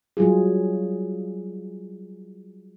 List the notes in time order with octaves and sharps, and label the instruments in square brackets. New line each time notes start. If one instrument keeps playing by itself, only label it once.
[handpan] F#3 G3 F4 G#4